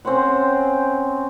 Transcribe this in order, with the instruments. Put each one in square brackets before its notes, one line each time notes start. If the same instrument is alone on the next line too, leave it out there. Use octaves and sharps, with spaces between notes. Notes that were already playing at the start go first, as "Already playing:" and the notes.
[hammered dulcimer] C4 C#4 C5 F#5